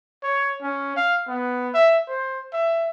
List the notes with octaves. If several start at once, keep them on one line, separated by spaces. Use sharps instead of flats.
C#5
C#4
F5
B3
E5
C5
E5